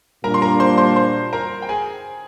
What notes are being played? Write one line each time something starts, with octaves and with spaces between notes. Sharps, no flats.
A#2 G3 A#3 D4 A#4 A#5
C6
A#4 A#5
C5 C6
C5 C6
C5 C6
A#4 A#5
G5
G#4 G#5